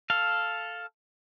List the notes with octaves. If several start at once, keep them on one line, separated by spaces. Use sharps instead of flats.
A4 F5